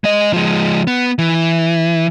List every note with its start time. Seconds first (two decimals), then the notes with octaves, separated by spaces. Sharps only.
0.04 G#3 D#5
0.34 F3 G#3
0.87 B3
1.19 E3